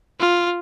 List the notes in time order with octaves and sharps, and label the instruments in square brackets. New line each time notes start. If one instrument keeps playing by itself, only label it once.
[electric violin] F4